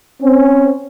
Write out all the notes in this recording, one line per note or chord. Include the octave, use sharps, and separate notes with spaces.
C4 C#4